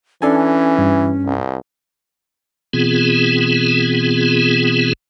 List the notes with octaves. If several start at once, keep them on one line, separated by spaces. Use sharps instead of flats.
E3 C#4 D4 A4 G#5
G2
C2
B2 E3 B3 C4 F4 G#4